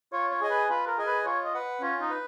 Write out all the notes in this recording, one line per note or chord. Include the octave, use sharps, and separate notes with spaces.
F4 C#5
C#5
G#4 D#5 G#5
B4
F4 B4
A#4
G#4 D#5 G#5
B4
F4 C#5
D#5
B4 F#5
C#4 F4
D#4
B4